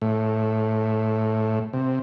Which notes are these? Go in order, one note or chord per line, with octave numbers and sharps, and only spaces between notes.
A2
C3